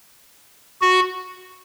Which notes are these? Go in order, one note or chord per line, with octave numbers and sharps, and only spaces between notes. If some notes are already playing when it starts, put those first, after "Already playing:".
F#4